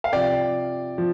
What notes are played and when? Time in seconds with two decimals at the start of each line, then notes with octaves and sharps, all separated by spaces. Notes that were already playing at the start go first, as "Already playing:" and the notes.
0.04 F5
0.13 C3 F3 D5 G5
0.98 F3